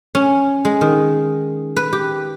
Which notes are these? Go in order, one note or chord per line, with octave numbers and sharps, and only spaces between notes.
C#4
G#3
D#3
B4
G4